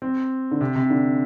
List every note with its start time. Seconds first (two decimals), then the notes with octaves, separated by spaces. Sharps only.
0.02 C4
0.51 D3
0.61 C3
0.76 C3
0.90 D3